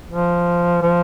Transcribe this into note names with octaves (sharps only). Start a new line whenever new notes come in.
F3
F3